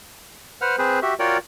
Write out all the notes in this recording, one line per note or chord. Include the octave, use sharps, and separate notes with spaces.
B4 C5 F#5 F6
C4 G#4 B4 C5
F#4 G4 E5
F4 F#4 A#4 C#5 D5 G5